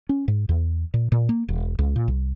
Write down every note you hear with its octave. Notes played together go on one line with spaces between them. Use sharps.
C#4
G#2
E2
A#2
A#2
A#3
E1
C#2
A#2
C2